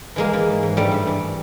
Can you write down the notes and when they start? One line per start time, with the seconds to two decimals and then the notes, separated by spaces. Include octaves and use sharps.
0.16 E3 G#3 A#3
0.33 E3
0.48 G#2
0.63 G#2
0.77 G2 G3 A3
0.92 G2
1.07 E3